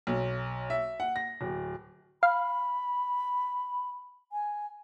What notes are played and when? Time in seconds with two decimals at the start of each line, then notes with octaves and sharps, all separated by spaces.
0.07 B1
0.70 E5
1.00 F#5
1.16 A#6
1.41 D1
2.23 F5 B5
4.32 G#5